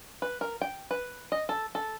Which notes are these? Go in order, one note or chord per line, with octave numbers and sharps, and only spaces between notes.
B4
A#4
G5
B4
D#5
A4
A4